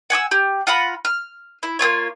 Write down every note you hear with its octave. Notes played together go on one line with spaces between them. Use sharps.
F#5 G#5 D6 E6
G4
F4 F#5 A#5 B5
F6
E4
A#3 C4 F4 C#5